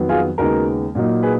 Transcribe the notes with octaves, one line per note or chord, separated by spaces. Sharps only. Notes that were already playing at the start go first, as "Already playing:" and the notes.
Already playing: F2 D#3 F#3 B3
F4 G#4
D#2 C#3 G#3 B3 D#4 F#4 A#4
A#2 F#3 A#3 D#4
G#4 B4